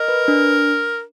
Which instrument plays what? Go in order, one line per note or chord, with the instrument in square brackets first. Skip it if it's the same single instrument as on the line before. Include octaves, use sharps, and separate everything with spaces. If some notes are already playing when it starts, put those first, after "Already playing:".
Already playing: [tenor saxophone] A#4 [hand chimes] D#5
[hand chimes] B4
D4